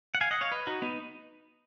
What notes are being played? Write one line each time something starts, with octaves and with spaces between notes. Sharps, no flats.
F#5
F5 G#5
D#5 F#5
C#5 F5
B4 D#5
D#4 F#4
B3 D#4